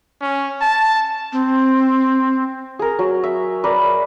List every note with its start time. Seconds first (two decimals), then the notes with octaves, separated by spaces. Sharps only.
0.21 C#4
0.61 A5
1.33 C4
2.79 G#4 A#4
2.99 F#3
3.24 E5
3.64 A#4 B4 D5